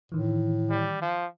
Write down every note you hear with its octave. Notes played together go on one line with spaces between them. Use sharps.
A2 D#3 E3
G3
F3